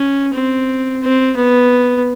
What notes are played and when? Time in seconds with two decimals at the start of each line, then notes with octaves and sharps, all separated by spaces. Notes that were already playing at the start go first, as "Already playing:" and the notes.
Already playing: C#4
0.33 C4
1.02 C4
1.37 B3